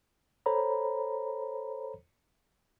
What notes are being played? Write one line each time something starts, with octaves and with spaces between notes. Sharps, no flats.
A4 C5 C#5 A#5 B5